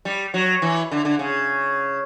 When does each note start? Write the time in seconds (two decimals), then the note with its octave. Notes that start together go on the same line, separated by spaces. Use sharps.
0.05 G3
0.34 F#3
0.62 E3
0.91 D3
1.05 D3
1.19 C#3